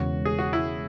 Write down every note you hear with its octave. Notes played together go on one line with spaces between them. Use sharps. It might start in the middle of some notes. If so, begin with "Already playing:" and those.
Already playing: E1 E2 C#3 G#3 C#4 F#4
G#4
F#4
E4